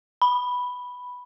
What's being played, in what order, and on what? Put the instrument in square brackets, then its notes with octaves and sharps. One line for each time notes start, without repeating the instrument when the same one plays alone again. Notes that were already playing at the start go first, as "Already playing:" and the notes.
[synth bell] B5